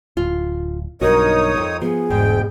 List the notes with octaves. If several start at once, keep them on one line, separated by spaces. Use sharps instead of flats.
D1 F4
B1 G2 D#4 F#4 A#4 C#5 D#6
F2 A#4
F3 B3 G#4
E1 D2 G#2 B2 G5